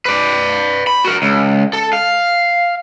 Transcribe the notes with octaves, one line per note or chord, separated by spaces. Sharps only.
B4 D5
B5
F#4 A#4
C#2
A4
F5